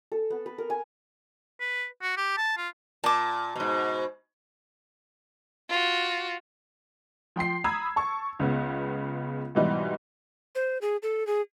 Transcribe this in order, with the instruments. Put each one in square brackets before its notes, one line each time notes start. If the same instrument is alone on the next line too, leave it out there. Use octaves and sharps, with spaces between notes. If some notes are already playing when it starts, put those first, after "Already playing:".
[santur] A4
B3
B4
A#4
G#5
[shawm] B4
F#4
G4
A5
F4
[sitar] A#2 [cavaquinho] A5 D6
[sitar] G#2 B2
[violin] F4 F#4
[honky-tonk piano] F3 G5 C6 C7
A#5 B5 D#6 E6 G#6
A5 C#6
C#2 C#3 B3
G#2 B2 E3 G3 D#4 E4
[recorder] C5
G#4
A4
G#4